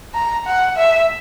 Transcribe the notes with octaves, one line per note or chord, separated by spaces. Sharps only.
A#5
F#5
E5